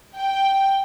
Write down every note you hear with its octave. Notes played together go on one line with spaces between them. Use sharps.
G5